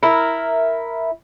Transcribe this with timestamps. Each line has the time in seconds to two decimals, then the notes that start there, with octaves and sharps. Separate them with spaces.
0.03 E4 A#4